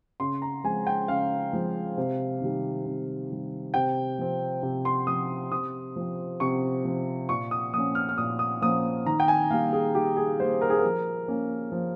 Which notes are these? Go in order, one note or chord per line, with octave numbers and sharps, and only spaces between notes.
C#3 C6
A#5
F3 G#3 C4 G#5
G5
C#3 F5
F3 G#3 C4
C3
D#3 G3
C3
D#3 G3
C3 G5
F3 C4
C3
C6
F3 C4 D#6
C3 D#6
F3 C4
C3 C#6
F3 C4
A#2 C#6
D#6
F3 A#3 C#4 D#6
F6
F6
A#2 D#6
D#6
F3 A#3 C#4 D#6
D#3 A#5
G5
G#5
G3 A#3 F5
G#4
D#3 G4
G#4
G3 A#3 C5
A#4
G#4
F3 A#4
A#3 C#4
F3